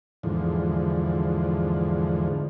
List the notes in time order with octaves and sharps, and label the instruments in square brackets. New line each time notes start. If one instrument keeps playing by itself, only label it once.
[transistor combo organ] E2 G#2 D3 F3